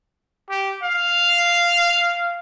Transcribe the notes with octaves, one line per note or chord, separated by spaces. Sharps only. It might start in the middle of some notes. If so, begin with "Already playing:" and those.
G4
F5